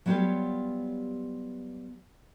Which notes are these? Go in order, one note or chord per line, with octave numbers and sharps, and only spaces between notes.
F#3 G3 B3 F4 G4 C#5